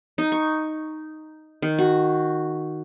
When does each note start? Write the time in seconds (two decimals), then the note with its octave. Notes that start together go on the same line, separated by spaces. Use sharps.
0.18 D#4
0.32 C#6
1.62 D#3
1.79 F#4